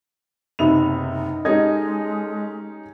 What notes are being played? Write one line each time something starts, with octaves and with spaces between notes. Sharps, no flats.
F#1 C3 B3 D#4 E5 F7
G#3 C#4 D#4 G4 A4 D#5 G#6